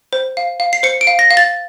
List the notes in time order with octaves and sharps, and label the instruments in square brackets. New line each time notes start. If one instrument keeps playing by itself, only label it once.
[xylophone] C5
F5
F5
C7
C5 C#7
D7
F5
A#6
F5
A6